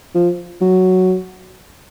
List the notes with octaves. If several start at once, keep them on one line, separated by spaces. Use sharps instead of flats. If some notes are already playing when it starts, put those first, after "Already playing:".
F3
F#3